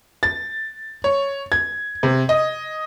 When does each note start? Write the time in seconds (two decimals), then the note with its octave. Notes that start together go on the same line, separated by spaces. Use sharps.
0.23 A6
1.04 C#5
1.52 G#6
2.03 C3
2.29 D#5